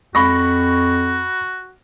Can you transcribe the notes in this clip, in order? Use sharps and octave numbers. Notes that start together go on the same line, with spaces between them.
F2 F#4 B5 C#6 A#6